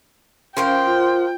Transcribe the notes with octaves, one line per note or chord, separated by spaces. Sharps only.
F3 C#4 A#4 C5 F5 G5
F4